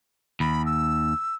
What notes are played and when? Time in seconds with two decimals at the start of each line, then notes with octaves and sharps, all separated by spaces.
0.40 D#2 B5
0.66 E6